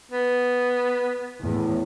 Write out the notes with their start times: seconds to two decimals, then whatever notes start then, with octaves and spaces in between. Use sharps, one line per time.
0.12 B3
1.42 E2 A2